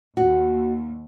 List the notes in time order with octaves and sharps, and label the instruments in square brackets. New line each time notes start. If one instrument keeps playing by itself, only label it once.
[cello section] D#2 [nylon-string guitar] F#4